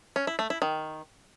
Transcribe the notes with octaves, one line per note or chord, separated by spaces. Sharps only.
C#4
E4
A3
E4
D#3